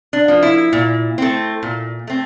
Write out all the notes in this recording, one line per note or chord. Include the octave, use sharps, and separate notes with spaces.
D4
F3 A#3
E4
A#2
A3 C4
A#2
A3 C4